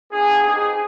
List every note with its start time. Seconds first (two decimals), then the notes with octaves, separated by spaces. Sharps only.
0.11 B3 D4 F4 G#4
0.41 C4 D#4 G4 G#4